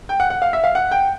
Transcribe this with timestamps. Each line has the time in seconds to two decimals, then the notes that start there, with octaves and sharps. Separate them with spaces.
0.09 G5
0.20 F#5
0.30 F#5
0.42 F5
0.53 E5
0.64 F5
0.75 F#5
0.91 G5